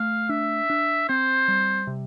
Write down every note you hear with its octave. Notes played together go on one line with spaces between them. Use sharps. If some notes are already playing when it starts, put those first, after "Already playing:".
Already playing: A3 F5
D4 E5
D4
C4 C5
G3
C3